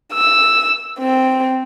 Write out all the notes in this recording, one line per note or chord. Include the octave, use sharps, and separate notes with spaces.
E6
C4